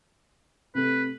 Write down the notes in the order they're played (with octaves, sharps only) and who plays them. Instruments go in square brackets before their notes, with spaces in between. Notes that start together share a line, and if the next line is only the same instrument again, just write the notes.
[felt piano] C3 A3 [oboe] B4